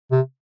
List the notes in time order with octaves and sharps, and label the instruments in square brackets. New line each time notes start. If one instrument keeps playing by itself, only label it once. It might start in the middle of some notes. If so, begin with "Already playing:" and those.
[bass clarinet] C3